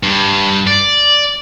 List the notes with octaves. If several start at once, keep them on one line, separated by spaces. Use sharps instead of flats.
G2
D5